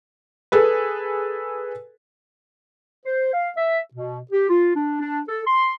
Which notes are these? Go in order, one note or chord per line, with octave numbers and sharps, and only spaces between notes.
G#4 A4 B4
C5
F5
E5
B2
G4
F4
D4
D4
A4
C6